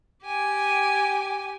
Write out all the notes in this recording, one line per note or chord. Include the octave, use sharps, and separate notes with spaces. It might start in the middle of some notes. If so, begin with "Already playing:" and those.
G4 G#5